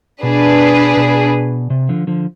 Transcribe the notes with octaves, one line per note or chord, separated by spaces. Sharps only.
B2 D4 G#4 B4
B2
C3
D3 F3
D3 F3